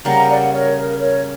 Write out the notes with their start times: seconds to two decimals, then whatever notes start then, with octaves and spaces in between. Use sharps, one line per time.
0.05 C#3 G3 A#3 F#5 A#5
0.29 D5 F#5
0.52 A#4 C#5
0.76 A#4
0.99 A#4 C#5